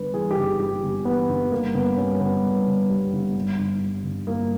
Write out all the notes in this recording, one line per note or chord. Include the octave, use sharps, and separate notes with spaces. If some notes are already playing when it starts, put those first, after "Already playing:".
Already playing: G1 G2 B4
E3 G#4
G4
G1 G#4
G2 G4
G1
E3 B3
G1
G2 A#3
G1 B3
G3 C#4
G1 B3
G2
G1
G3
G1
G2
G1
G3
G1
G2 A#3